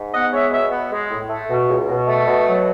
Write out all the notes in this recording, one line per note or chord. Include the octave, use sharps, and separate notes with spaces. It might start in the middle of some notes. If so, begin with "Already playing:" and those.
Already playing: G#2
B3 D#5 F#5
G#3 C#5 E5
B2 C#5 E5
B3
G#3
A2
A3
B2
C#2
B2
A3
B2
F#3